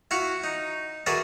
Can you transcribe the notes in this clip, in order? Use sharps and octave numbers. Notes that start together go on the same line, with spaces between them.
E4 F#4 F5 F#5
D#4
F#4 G#4 A#4 B4 D5 E5